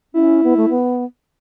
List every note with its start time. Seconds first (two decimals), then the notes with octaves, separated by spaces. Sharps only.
0.14 C#4 E4
0.44 B3
0.57 A3
0.69 B3